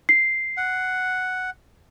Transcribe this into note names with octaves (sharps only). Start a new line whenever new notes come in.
C7
F#5